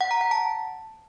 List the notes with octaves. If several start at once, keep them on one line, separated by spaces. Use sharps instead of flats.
F#5
A#5
F#5
A5